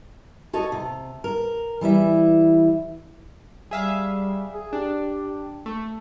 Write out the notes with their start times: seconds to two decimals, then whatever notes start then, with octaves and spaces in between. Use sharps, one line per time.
0.53 F#4 A4 C#5 D#5
0.72 C3
1.24 A#4
1.81 E3 G3 E4 E5
3.71 G3 G#4 E5 F5
4.54 G#4
4.73 D4 G4
5.66 A3